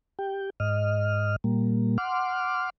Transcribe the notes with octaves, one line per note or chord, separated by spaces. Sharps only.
G4 G5
G#2 D#5 F6
A#2 G3 A#3
F#5 C6 D6 F6